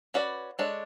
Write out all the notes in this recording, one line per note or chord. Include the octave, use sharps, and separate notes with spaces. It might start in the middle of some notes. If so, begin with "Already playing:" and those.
C#4 F#4 B4 D5
G#3 D4 A4 C#5